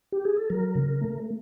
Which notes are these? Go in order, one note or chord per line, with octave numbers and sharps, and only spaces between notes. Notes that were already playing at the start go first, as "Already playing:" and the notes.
G4
G#4
A4
F#3 A#4
C#3
A3